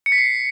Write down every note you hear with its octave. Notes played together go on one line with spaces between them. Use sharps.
C#7
B6
C7